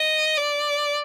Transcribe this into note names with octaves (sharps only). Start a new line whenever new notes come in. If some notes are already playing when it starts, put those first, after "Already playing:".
Already playing: D#5
D5